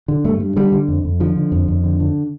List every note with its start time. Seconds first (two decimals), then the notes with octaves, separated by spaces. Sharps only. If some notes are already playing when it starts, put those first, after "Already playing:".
0.08 D3
0.24 G2 A3
0.40 G2
0.56 D3 G3
0.72 D3
0.88 F2
1.05 F2
1.20 D3 F3
1.36 D3
1.52 F2
1.68 F2
1.84 D3
2.00 D3